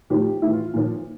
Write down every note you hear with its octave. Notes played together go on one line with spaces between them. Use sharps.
A2 F3 G4
A2 E3 E4
F4
A#2 F3